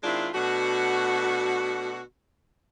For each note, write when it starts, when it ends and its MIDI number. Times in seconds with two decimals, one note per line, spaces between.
0.04 0.28 51
0.04 0.28 56
0.04 0.28 60
0.04 0.28 62
0.04 0.28 64
0.04 0.28 65
0.34 2.01 47
0.34 2.01 57
0.34 2.01 62
0.34 2.01 66